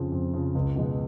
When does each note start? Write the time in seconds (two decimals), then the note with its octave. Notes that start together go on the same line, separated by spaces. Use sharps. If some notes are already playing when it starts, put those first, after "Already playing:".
Already playing: F2 C#3 F3
0.12 F2
0.34 C#3 F3
0.55 C#2
0.76 B2 G#3